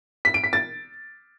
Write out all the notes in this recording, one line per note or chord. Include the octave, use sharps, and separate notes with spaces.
B6
D7
B6
A6